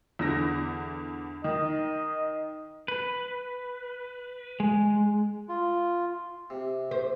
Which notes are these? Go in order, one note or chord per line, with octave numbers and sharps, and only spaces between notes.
E2 D3 A#6
D#3 D#5
B4
G#3
F4
C3
C5